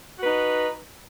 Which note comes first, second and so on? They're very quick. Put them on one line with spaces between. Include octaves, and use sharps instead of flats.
F#4 B4 D#4